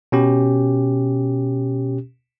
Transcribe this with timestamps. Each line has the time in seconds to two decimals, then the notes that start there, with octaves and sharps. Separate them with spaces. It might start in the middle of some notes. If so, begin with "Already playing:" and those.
0.12 B2 C#4 G4